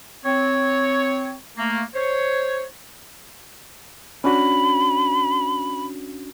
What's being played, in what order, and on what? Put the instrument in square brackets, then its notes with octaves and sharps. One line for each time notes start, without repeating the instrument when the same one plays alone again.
[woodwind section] C4 C#5
A3 A#3
C5 C#5
[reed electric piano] C#4 D4 F#4 [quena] B5